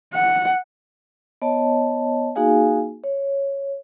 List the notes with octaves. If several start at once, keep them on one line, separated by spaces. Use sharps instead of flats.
F#5
B3 C#5 D#5 A5
A#3 D#4 F#4 G#4 F5 G#5
C#5